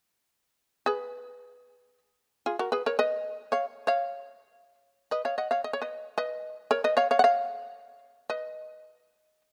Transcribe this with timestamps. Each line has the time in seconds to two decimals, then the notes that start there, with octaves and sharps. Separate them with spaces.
0.86 G#4 B4
2.46 F4 G#4
2.59 F#4 A#4
2.72 G#4 B4
2.86 A#4 C#5
2.99 B4 D#5
3.52 C#5 F5
3.87 C#5 F5
5.11 B4 D#5
5.25 C#5 F5
5.38 D#5 F#5
5.51 C#5 F5
5.64 D#5
5.73 C#5
5.82 B4 D#5
6.18 B4 D#5
6.71 A#4 C#5
6.84 B4 D#5
6.97 C#5 F5
7.11 C#5 F5
7.19 F#5
7.24 C#5 F5
8.30 B4 D#5